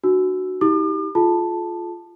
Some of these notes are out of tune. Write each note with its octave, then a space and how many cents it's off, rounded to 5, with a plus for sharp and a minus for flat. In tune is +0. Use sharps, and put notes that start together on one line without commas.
D4 +35 F#4 +0 E6 +0
D#4 +45 G4 +0 D6 +45
F4 +0 G#4 +40 A5 +0